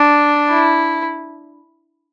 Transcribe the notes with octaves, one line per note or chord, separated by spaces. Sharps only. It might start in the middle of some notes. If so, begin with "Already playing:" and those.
Already playing: D4
E4